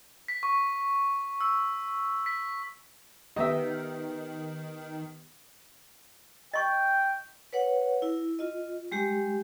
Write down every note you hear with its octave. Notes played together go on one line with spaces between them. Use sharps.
B6
C#6
E6
B6
D#3 B3 G4 D#5 E5
D#5 G5 C#6
B4 C#5 F#5
E4
F4 D#5
G3 G#3 G4